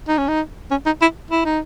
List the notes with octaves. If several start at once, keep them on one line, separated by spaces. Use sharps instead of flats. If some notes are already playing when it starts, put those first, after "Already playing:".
D#4
C#4
D#4
C#4
D#4
E4
E4
D#4